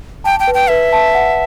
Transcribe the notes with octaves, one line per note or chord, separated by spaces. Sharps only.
G5 A5
G5
B4
G5
B4 E5
A5
F#5